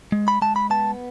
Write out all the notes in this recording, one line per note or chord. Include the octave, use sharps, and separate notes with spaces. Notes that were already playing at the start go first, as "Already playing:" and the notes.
G#3
B5
G#3 A5
B5
B3 A5